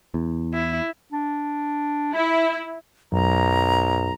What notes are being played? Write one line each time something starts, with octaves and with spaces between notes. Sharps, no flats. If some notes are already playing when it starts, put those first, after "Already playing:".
E2
E4
D4
E4 B5
B1 F#2 A#5